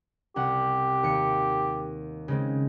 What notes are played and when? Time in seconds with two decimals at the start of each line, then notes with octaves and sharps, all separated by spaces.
0.36 C2 G4 F#5
1.03 D#2 C#7
2.28 C#3 G#3 C4